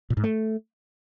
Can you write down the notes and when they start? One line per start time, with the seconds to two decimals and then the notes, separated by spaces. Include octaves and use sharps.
0.10 A#2
0.17 G#2
0.24 A3